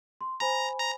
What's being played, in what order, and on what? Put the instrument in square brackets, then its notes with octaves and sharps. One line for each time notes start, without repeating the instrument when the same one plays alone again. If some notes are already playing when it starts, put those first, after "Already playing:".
[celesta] C6
[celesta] C5 G#5 B5 [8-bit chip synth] A#5
[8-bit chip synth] A#5